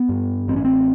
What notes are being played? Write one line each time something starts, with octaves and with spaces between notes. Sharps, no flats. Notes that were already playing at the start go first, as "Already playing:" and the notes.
Already playing: B3
G2
A1 C4
C#4
C4